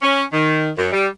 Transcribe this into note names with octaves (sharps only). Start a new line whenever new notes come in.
C#4
D#3
F#2
G3